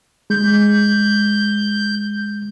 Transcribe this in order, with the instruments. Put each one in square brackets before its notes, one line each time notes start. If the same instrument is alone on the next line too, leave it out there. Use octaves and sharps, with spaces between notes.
[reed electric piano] G#3 [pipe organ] G6